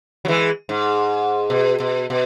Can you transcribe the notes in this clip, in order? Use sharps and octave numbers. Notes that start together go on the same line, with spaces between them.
F#3
E3 G#3
G#2
B2
B2
B2